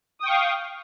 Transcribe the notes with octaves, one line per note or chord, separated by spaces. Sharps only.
F5 G5 C#6 D#6